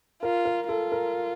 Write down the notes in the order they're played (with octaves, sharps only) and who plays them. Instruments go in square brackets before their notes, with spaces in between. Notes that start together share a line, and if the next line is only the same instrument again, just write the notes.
[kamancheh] F4 [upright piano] A#4
[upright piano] A#4
[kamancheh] F4 [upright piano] A4
[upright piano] A#4